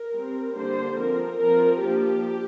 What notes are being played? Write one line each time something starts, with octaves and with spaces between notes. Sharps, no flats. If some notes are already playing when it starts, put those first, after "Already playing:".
Already playing: A#4
G3 C4
D3 G3 A#3 D4 C5
F3 C4 A#4
F3 C4 A#4
F3 A#3 D4 G4